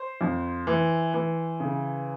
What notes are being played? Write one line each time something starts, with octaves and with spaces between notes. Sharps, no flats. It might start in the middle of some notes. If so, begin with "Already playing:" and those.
Already playing: C5
F2
E3
E3
C#3